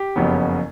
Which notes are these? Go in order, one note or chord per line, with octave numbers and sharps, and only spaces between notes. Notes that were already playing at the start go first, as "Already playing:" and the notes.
Already playing: G4
F#1 F2 C#3 F#3 B3